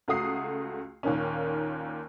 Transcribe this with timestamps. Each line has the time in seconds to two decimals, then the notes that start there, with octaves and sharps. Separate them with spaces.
0.08 C#2 A3 F#4 D#6 C7
1.03 D#2 A#2 D#3 A#3 C#4